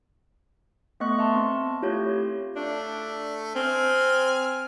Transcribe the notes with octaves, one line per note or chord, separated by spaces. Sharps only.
A3 B3 D#5 C#6 F#6
E5 A5 C6
C4
A3 E4 F4 G4 C#5 G6
A3 D4
C4 G#5 F6